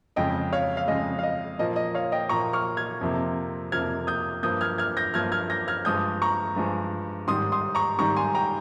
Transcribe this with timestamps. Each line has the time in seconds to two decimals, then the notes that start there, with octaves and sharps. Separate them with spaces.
0.16 F2 C#3 G#3 D#5 G5
0.53 C#5 F5
0.77 F5
0.87 F2 C#3 G#3 D#5
1.19 F5
1.23 D#5
1.59 A#2 F3 A#3 D#5
1.76 D#5
1.94 C#5 F5
2.12 D#5 G5
2.29 A#2 F3 A#3 A#5 C#6
2.53 C#6 F6
2.77 F6 G#6
3.01 F2 C3 F3 A#3
3.72 F2 C3 F3 A#3 F6 G#6
4.07 D#6 G6
4.43 G2 F3 A#3 D#6 G6
4.61 F6 G#6
4.78 F6 G#6
4.97 G6 A#6
5.14 G2 F3 A#3 F6 G#6
5.32 F6 G#6
5.50 G6 A#6
5.68 F6 G#6
5.85 G2 F3 G#3 D#6 G6
6.22 A#5 C#6
6.56 G2 F3 G#3
7.27 G#2 D#3 G3 C6 D#6
7.52 C6 D#6
7.75 A#5 C#6
7.99 G#2 D#3 G3 A#5 C#6
8.17 G#5 C6
8.35 G5 A#5